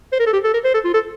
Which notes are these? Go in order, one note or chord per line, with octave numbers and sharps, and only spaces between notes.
C5
A#4
A4
G4
A4
A#4
C5
A4
F4
A4